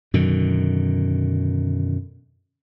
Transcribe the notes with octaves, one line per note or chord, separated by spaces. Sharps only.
F#2 B2 D3 D#3